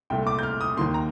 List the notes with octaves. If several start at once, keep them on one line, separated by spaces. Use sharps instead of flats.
C2 A#2 A3 G5
D6
G6
F6
D#6
D#2 D#3 A#3 C6
A#5